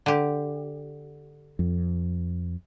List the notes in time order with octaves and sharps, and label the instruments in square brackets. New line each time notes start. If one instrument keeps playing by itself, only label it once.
[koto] D3 G4
[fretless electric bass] F2